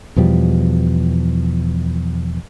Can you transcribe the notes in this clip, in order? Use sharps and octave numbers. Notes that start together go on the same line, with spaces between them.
E2 B2 F3 G3